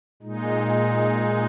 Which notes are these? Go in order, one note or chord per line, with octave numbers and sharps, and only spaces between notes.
A#2 G#3 D#4